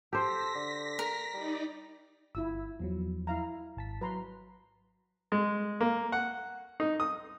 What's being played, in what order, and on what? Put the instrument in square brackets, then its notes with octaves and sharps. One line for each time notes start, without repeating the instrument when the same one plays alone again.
[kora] G4 C5 [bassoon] A4 [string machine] A#6 B6
[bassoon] D3
[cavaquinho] A#4
[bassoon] G3 [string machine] D#4 D5
[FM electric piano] G1 [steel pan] E4 F4 E6
[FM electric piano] E2 F3 F#3
[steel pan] E4 F5 A#5
[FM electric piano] G#1 A5 B6
[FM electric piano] F#3 [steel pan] B4 A#5 C6
[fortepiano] G#3
A#3
F#5
D#4
D#6